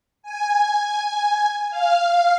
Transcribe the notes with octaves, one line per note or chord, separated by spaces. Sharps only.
G#5
F5